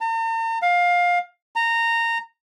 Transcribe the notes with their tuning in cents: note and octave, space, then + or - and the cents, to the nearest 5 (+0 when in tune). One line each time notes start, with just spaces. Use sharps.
A#5 -45
F5 +20
A#5 -15